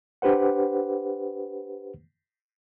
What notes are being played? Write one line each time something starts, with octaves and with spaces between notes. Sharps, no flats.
D4 G4 B4 C5 F#5